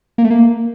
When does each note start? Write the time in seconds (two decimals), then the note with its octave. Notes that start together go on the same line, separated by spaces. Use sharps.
0.18 A#3
0.24 A3
0.31 A#3